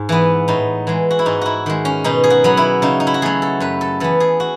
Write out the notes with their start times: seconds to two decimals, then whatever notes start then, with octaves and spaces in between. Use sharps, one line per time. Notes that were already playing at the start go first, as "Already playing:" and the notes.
Already playing: G#2
0.09 E3 B3
0.48 A2 D#4
0.87 E3 G#3
1.11 F#4
1.19 E4
1.26 G#2 D#4
1.41 E4 F#4
1.66 D#3 G#3
1.85 C#4
2.04 B2 D#4
2.24 G#4
2.30 F#4
2.44 F#3 B3
2.57 E4
2.82 C#3 D#4
3.00 D#4
3.07 E4
3.14 F#4
3.22 F#3 A3 G#4
3.42 A4
3.60 F#2 B4
3.81 A4
4.00 E3 B3 A4
4.20 G#4
4.40 F#4